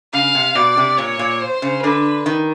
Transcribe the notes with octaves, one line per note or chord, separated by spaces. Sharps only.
C#3 F5
C3
B2 D5
C3
A#2 C#5
A#2
C5
C#3
D3 B4
D#3